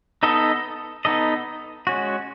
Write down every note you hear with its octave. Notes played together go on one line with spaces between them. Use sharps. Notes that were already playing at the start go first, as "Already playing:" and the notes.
B3 D#4 A4 D#5
B3 D#4 A4 D#5
G#3 C#4 F#4